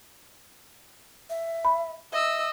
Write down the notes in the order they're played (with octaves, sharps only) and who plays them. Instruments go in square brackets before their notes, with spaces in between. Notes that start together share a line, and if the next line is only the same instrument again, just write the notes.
[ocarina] E5
[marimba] B5
[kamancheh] D#5 E6 [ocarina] E5